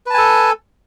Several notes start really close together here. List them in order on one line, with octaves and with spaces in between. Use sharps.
B4 A5 G#5 A4